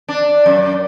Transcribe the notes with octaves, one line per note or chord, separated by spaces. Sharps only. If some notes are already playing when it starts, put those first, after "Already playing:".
D4
F#2